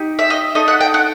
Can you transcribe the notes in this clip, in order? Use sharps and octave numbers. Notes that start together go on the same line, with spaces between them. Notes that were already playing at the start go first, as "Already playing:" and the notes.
Already playing: D#4 G4
E5
D#5
D#4 A4 D#5
F#5
G5
F#5